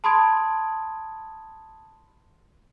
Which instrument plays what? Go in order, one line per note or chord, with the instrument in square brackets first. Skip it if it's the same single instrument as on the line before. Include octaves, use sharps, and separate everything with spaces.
[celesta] A5 B5 C6 D#6 G#6 D7